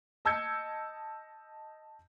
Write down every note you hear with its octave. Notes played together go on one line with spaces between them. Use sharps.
D#5 A5 E6 G6 G#6 C#7